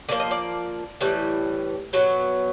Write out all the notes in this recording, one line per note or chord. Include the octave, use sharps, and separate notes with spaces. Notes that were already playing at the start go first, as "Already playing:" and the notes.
D3 F3 A#3 D5
D#5
D5
A2 E3 G3
B2 F#3 B3